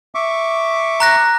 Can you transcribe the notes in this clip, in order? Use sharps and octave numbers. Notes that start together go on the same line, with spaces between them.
E5 C#6 D6
A#5 F#6 A#6